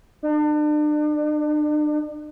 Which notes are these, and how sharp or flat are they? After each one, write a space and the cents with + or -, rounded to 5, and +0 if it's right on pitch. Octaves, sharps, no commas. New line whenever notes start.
D4 +40